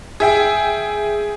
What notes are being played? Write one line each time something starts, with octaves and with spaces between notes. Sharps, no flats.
G#4 E5 G5